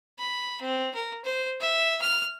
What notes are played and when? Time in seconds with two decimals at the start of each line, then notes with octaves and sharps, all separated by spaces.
0.19 B5
0.61 C4
0.95 A#4
1.24 C5
1.61 E5
2.01 F6